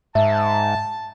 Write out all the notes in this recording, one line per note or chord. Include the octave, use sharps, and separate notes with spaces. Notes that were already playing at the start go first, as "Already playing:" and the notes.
G#2 E5 A5